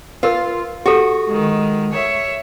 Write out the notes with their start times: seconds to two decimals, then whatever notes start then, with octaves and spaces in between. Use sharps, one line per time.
0.23 F4 A#4 B4
0.86 F#4 G4 A4
1.27 D#3 G#3
1.93 C#5 E5